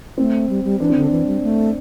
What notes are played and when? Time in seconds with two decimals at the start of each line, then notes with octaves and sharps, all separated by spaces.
0.18 A3 C4
0.50 G3
0.64 G3
0.80 E3 D4
0.90 C4
0.95 D3
1.01 D4
1.11 E3
1.27 G3
1.42 A3